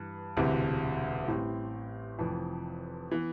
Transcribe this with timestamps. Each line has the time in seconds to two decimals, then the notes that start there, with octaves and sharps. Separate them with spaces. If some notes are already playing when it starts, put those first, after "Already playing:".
Already playing: G2 E3
0.37 E1 D2 C3 E3
1.27 A1 A2 G3 C4
2.19 F1 F2 E3
3.11 E3 B3